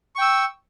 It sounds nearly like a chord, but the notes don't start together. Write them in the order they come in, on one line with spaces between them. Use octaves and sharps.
C#6 G5 E6